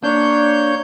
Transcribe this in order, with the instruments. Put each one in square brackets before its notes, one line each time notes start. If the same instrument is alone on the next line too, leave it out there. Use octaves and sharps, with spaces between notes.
[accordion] A#3 C#5 G6 [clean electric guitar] D4